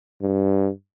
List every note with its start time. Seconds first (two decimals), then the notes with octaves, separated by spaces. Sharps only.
0.22 G2